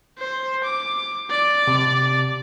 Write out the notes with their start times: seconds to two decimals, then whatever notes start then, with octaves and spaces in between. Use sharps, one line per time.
0.18 C5
0.63 D6
1.30 D5
1.67 C3